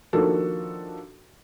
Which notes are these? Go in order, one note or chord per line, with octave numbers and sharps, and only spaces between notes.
D#3 F3 A#3 D4 F#4 A4